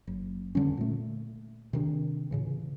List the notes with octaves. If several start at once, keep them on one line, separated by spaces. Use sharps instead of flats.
F#1
F2 D3 G3 C#4
A#2 A3
C3 D#3 D4
A2 C#3 E3